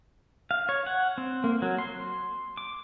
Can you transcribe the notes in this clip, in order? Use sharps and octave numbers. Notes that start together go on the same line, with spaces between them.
F5
C#5
F#5
C4
A#3
F#3
C6
D6